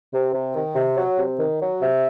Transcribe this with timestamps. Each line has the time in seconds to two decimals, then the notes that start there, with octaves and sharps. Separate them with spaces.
0.13 C3
0.33 C3
0.55 D#3
0.75 C3
0.96 F#3
1.18 C3
1.38 D#3
1.60 F#3
1.80 C3 E5